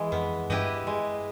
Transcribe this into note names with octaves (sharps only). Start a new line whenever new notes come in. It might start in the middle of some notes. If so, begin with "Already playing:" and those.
Already playing: E3 G#3
F2 B3
G2 E4 G4 B4 D#5
G#3